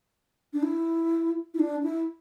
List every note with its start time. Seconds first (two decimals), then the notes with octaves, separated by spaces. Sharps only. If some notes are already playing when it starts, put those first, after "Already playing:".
0.53 D4
0.63 E4
1.54 E4
1.59 D4
1.83 E4